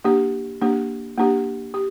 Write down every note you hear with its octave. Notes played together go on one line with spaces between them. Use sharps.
A#3 D4 G4
A#3 D4 G4
A#3 D4 G4
G4